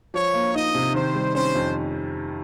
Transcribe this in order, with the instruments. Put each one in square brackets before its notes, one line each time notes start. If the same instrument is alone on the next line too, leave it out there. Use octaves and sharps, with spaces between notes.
[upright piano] F3 [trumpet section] C#5
[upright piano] A#3
[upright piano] D#4 [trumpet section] D#5
[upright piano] C3
[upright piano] D#3 [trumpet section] C5
[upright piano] G3
[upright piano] C#4 [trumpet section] C5
[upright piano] F2